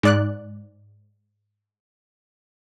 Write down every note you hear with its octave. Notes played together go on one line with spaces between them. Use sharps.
G#2 D5 F#6